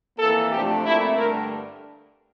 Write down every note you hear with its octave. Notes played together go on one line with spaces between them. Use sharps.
F2 E3 A#3 A4
C3 F3 A3 D4 G4
A#2 A3 C4 E4
G2 D3 A3 D4 A#4